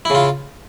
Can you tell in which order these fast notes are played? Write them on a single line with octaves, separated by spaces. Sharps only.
E4 C#3 F4